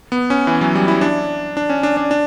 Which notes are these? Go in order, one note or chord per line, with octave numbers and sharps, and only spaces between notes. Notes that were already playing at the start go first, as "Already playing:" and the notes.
B3
C#4
E3
F#3
G3
E4
D4
D4
C#4
D4
D4
D4